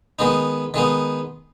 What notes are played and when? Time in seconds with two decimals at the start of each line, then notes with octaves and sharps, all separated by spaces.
0.19 D#3 G#3 B3 D#4
0.74 D#3 G#3 B3 D#4